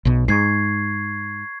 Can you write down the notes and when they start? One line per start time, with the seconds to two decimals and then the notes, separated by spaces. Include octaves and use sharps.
0.05 B1 B2
0.28 G#2 C#6 G#6 C7